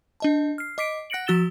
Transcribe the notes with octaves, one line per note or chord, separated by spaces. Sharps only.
D4 D#5 A5
F6 C7
D#5 D6 B6 C7 D7
F#5 F#6 A#6 C#7 D7 F#7
F3 F#4 E6 A6 E7 G7